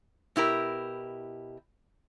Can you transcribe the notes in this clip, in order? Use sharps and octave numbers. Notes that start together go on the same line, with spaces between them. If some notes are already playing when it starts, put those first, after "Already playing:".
B2 E4 G4 A#4